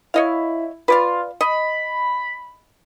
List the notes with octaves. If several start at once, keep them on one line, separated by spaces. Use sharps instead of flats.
E4 C#5 D#5 F5
F4 B4 D5 F5
D#5 B5